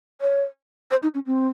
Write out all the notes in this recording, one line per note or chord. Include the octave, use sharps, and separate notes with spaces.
C#5
C5
D#4
C#4
C4